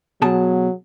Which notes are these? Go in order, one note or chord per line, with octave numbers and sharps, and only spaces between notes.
B2 F#3 G#4 A5